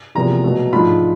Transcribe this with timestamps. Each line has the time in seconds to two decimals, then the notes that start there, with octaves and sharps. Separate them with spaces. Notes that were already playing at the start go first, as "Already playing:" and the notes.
0.15 E2 C3 F3 A#3 A#5
0.44 B2 F#3 A3
0.72 G#2 F3 A3 D4 F4 B5